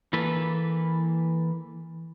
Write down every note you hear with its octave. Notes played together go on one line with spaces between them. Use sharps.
E3 A#3 A4 B4